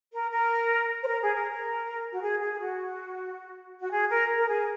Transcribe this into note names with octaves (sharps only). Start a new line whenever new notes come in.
A#4
A#4
C5
A#4
G#4
A#4
A#4
F#4
G#4
G#4
G#4
F#4
F#4
G#4
A#4
A#4
G#4